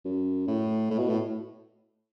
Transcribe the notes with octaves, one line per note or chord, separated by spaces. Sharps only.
F#2
A2
A2
B2
A2